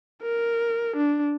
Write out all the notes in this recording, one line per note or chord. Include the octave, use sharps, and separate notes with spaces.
A#4
D4